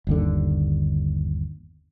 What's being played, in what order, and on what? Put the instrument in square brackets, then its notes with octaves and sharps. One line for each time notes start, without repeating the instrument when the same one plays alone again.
[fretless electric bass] G1 D#2 D3